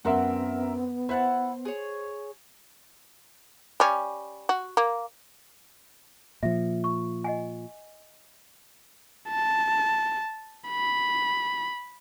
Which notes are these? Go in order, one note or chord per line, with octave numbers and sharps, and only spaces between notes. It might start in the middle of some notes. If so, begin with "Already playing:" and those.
F#2 B3 C4 A#4 E5 F#5
E4 C5 F#5 A5
G#4 C#5
G3 C#4
F#4
A#3
A#2 F3 E5
C#6
D#5 F#5 G#5
A5
B5